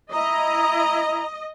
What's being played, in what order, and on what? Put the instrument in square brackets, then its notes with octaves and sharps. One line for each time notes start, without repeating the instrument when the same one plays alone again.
[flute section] E4 A#5 [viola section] D#5